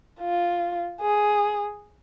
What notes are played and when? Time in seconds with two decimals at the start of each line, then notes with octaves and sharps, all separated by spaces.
0.20 F4
1.01 G#4